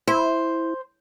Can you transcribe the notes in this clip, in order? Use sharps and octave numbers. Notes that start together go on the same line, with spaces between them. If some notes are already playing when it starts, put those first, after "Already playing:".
E4 C5